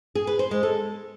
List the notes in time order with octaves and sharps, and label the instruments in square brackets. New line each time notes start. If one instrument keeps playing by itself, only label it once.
[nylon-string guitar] G#4
B4
C5
G#3
A4